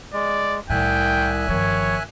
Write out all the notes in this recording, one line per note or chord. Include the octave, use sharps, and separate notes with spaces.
G#3 D5
C2 A2 D#3 E5 G5 G#5 F#6
G1 D#3 F3 C#5